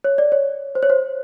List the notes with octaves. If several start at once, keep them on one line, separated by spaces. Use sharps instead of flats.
C#5
D5
C#5
C5
C#5
C5